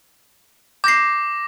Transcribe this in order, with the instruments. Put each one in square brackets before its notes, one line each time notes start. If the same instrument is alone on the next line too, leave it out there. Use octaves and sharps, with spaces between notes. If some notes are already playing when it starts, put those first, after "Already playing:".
[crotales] D6 A#6 [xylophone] G6 C7